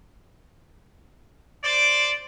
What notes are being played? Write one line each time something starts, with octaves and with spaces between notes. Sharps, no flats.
C5 D5